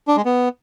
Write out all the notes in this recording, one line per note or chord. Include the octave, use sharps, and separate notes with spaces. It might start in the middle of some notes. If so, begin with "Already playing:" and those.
D4
G#3
B3